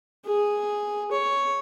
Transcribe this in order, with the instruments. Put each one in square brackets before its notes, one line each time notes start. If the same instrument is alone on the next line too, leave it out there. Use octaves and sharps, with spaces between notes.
[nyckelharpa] G#4
C#5